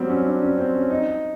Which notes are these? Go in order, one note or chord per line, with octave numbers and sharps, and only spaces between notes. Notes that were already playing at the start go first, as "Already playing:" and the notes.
Already playing: F#3 G3 C4
C#4
D4
C#4
C4
C#4
D#4